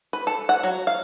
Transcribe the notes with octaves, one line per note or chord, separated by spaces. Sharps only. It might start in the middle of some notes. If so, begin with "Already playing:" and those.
B4
A4
F#5
F#3
F5